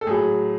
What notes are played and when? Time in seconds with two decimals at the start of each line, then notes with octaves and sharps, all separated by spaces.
0.01 A4
0.06 A2 F#3 G#4